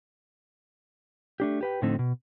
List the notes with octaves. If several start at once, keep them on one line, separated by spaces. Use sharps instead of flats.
A3 D4 G4
G4 B4 G5
A2 D3 F3 A3 C4 D#4
B2